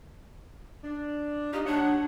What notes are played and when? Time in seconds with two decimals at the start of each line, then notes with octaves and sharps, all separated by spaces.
0.84 D4
1.53 D#4 F4 G4
1.66 D#2 D4 C#5 F#5